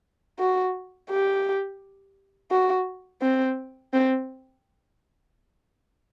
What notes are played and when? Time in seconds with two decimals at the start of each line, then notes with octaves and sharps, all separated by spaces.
0.39 F#4
1.10 G4
2.51 F#4
3.21 C4
3.93 C4